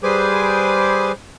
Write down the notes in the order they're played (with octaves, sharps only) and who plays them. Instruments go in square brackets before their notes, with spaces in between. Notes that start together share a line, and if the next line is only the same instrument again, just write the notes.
[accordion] G3 G#4 B4 C5 G#5 D6